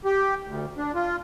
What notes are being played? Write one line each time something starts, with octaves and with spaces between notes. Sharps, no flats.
G4
D2
D4
F4